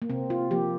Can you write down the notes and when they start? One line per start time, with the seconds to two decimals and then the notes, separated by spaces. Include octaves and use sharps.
0.02 A#3
0.10 C3 C4
0.30 F4
0.51 F3 A#3 G4